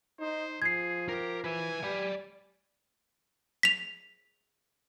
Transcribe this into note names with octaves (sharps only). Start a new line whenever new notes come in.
D#4 C5
F3 G#4 G#6 C7
G4 A#4
B4 E5 G#5
G4 D5 B5
B6 F7